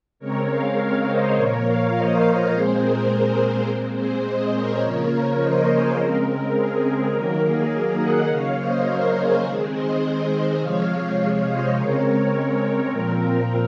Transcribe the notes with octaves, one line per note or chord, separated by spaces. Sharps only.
C#3 G#3 C4 A#4 C#5
C#5 F5
C#5 F5
C5 D#5
A#2 F3 A#3 A#4 C#5
C#5 F5
C5 D#5
A#4
A#2 G#3 C4 G#4 C5
A#4
A#2 G#3 C4
G#4 C5
C5 D#5
A#4 C#5
C#3 F3 A#3
C5 D#5
G#4 C5
C#3 G#3 C4 A#4
G#4
D#3 F#3 A#3 A#4
G#4
A#4
D#5 F#5
C#3 F#3 A#3 C#5 F5
C5 D#5
A#4 C#5
G#4 C5
D#3 G#3 C4 G#4
C5 D#5
C3 F3 G#3 C#5 F5
C#5 F5
C5 D#5
C#3 G#3 C4 A#4 C#5
A#4
A#4
A#2 F3 C4 A#4
A#4